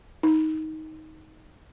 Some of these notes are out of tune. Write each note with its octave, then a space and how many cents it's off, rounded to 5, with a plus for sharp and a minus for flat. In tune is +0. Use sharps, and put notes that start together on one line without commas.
D#4 +15